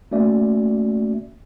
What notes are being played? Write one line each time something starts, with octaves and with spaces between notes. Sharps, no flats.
A3 A#3 C#4 F#4 D5 E5